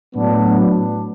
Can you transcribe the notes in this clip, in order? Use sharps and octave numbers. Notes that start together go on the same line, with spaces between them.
A2 F#3 B3 D4